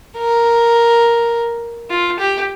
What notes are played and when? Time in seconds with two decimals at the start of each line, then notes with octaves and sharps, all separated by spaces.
0.18 A#4
1.90 F4
2.19 G4